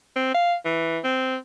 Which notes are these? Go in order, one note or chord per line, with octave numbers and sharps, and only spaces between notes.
C4
F5
E3
C4